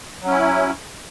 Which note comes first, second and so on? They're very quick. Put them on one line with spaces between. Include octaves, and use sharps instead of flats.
F#3 C#4 E4